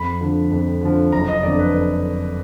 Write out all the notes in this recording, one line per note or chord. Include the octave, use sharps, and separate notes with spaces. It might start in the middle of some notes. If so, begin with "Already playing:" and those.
Already playing: F2 B5
D3 F3
F2
D3 F3
F#1 A#5
D#5
F2 D3 D5
B4